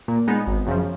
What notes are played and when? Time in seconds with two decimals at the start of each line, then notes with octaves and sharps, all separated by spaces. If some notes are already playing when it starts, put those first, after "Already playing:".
0.08 A#2
0.28 G#3 B3 D#4
0.47 G#1
0.66 F#2 C#3 F3